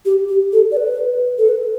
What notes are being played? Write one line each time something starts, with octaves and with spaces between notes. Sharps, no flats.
G4
G4
A4
D5
B4
A4
B4